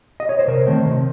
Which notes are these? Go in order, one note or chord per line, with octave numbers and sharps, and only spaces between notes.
D#5
C#5
C5
C3 A#4
D#3 A3 C4
C3